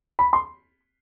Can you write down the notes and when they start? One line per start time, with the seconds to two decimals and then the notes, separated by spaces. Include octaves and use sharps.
0.19 B5
0.33 C6